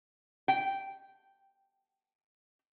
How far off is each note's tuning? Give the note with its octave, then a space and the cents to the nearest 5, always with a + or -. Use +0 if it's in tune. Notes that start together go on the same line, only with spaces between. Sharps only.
G5 -10